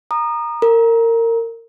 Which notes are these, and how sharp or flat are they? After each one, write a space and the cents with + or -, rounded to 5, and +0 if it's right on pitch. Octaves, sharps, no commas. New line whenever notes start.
A#5 +5 D#6 -30
A#4 -25 A#5 +15